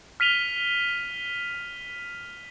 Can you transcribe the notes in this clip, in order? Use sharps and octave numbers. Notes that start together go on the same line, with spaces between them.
F6 B6 D#7 F7 G7